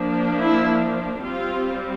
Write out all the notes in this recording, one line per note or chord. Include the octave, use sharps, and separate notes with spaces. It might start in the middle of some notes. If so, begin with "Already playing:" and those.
Already playing: F3 A#3 D4
E4
G3 C4 F4